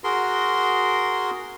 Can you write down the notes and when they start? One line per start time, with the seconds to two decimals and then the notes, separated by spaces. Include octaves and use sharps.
0.04 F#4 G#4 A#4 C6